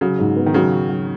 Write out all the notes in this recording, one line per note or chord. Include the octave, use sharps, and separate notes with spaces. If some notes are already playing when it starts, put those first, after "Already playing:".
C#3 F#3
G#2
B3
D#3
C#3 F#3
F#4
F#3